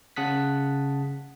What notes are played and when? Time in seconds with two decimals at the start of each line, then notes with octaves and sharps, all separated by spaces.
0.16 C#3 F#5 A5 D#6 F#6 B6